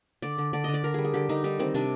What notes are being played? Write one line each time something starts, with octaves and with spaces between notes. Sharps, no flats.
D3 D5
D3
D3 D5
D3 D#5
D5
D3 A#4
G3 G#4
G#4
D3 G4
D3 D#4
G3 D#4
D#3 C4
C3 D4